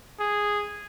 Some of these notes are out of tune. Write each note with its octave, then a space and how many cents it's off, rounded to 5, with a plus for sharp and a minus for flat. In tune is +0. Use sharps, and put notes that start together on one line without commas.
G#4 -5